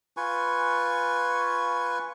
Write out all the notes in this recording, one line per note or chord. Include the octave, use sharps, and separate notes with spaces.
F4 B4 G#5 C#6